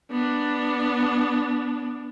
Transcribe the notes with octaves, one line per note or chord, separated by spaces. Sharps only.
B3 D4